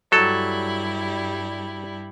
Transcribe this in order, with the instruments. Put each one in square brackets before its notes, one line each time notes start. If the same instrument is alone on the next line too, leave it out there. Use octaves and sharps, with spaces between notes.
[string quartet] G2 G3 E4 [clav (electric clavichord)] F#3 A4